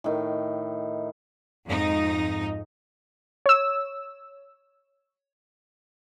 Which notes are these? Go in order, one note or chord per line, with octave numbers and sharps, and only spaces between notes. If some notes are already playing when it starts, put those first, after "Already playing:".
A2 D#3
F2 G#2 D#4
C#5 E6